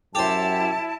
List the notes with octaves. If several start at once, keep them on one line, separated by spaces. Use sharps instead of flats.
F#2 E4 G4 C5 A5